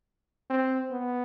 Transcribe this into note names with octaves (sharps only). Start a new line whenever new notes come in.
C4
B3